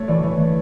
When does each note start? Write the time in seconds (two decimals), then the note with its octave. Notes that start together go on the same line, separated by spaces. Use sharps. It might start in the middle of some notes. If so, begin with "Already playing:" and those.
Already playing: A3 D4 C#5
0.08 E3 D5
0.23 E3
0.40 A3